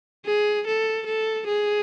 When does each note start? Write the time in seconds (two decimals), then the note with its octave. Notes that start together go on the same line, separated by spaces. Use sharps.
0.26 G#4
0.67 A4
1.06 A4
1.47 G#4